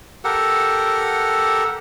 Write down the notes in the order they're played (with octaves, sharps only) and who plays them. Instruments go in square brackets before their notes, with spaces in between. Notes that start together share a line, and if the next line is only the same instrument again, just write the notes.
[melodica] G4 A4 A#4 F#5